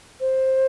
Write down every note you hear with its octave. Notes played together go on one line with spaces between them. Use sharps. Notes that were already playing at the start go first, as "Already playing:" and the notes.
C5